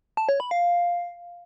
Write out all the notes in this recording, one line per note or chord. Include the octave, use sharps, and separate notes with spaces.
A5
C#5
B5
F5